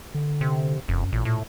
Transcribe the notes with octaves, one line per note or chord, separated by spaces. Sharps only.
D3
C3
F1 F#2
A1 A#2
A2